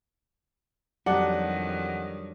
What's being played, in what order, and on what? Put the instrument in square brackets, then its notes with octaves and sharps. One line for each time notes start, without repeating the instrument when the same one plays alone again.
[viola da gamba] F2 D#3 [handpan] F#3 G3 G4 [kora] D4 D#4 [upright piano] F#5